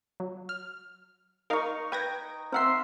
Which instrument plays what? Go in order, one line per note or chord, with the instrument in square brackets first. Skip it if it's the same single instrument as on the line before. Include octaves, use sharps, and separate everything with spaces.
[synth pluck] F#3
F6
[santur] D#4 C#6 [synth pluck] A#4 D#5 F5
[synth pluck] B4 G#6 A#6 [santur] G5
[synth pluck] C4 F#5 C7 [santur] A#4 E5 C6